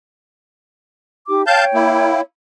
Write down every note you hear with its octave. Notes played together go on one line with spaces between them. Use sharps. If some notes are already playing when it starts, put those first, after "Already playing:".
D#4 G4 D6
C#5 F5 G5 A5 G6
A#3 E4